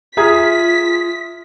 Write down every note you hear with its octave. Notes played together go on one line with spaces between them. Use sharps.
F4 G#4 E5 A#5 D#6 F6 G#6 B6